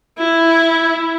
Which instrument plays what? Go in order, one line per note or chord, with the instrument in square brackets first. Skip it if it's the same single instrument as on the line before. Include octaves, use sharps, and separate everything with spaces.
[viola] E4